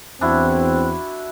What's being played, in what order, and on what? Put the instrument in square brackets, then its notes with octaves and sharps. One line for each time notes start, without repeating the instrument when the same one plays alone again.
[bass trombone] E2 [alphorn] C4 [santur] D4 E4 F#4